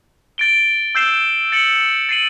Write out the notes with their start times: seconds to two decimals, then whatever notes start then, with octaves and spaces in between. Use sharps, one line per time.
0.38 A6 D7 G7
0.95 E6 G6 C7 E7 G7
1.52 A6 C#7 F#7
2.09 A6 C7 D#7 F#7